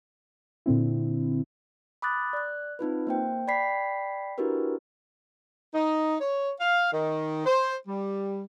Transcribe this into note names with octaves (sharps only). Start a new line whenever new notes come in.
A#2 D3 C4 E4
B5 D6 D#6 F#6 A6
D5 F#6
C4 D#4 F4 B4
A#3 C5 G5
D5 G5 B5 B6 C7
D4 E4 F#4 G4 A#4 B4
D#4
C#5
F5
D#3
C5
G3